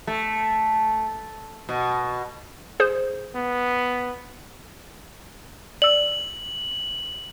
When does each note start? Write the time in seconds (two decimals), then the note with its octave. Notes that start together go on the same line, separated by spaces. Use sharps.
0.07 A3
1.69 B2
2.80 G#4 C5
3.35 B3
5.82 D5 E6 F#7